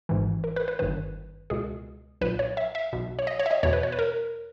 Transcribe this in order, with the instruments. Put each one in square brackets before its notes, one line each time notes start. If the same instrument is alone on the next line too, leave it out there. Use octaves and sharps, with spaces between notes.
[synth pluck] G#1 G#2 E3
A#4
B4
B4
G1 G2 D#3 B4
C#2 B2 G#4
B1 A#2 B4
C#5
E5
E5
B1 B2
C#5
D#5
C#5
E5
D#5
E2 B2 C#5
B4
C#5
B4
A#4